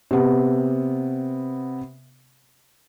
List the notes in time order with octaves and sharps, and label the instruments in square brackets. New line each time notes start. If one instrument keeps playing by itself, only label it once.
[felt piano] C3 B3